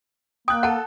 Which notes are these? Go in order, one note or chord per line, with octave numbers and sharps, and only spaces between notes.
A#3 G5 D#6 F#6
A4 F#5 A5